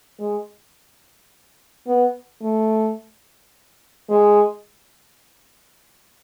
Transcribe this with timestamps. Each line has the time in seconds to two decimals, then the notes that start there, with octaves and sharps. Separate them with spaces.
0.20 G#3
1.87 B3
2.42 A3
4.10 G#3